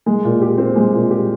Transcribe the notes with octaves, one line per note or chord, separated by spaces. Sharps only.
G#3
A#2
G4
C4
G#3
A#2
G4